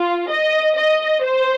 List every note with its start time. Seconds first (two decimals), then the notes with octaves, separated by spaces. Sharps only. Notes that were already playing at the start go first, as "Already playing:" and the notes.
Already playing: F4
0.29 D#5
0.76 D#5
1.23 C5